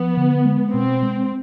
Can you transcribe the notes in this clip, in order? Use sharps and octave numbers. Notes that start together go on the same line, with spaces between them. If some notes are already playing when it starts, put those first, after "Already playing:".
Already playing: F3 B3
D3
G#3
B2 C4
G#3